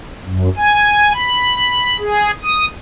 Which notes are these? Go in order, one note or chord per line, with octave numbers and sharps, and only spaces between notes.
F#2
G#5
B5
G#4
D#6